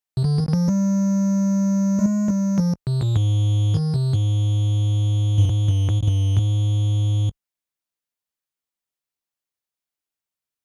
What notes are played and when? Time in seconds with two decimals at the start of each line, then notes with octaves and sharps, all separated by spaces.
0.17 C3
0.24 D3
0.38 D#3
0.49 D#3
0.53 F3
0.68 G3
1.99 G#3
2.28 G3
2.58 F3
2.87 C3
3.01 A#2
3.16 G#2
3.74 D#3
3.94 C3
4.13 G#2
5.38 G2
5.49 G#2
5.68 G2
5.89 G#2
6.03 G#2
6.07 G2
6.37 G#2